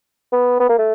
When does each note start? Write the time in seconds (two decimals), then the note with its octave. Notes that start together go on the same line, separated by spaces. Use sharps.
0.32 B3
0.60 B3
0.69 A#3
0.79 A3